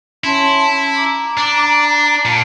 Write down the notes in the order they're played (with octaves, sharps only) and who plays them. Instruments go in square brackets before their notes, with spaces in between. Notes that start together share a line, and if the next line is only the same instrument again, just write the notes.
[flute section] C#4 A5 C6 [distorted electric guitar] E4
[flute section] A#5 D6
[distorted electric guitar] D4
[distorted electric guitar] A#2 [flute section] A5